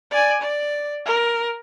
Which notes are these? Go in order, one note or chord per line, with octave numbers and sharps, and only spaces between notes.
D5 G#5
D5
A#4